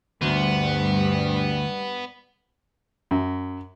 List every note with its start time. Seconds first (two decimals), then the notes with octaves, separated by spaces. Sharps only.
0.22 D2 G2 G3 B3
3.11 F#2